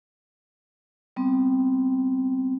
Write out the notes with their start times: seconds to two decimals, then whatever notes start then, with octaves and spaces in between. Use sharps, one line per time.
1.16 G3 B3 C4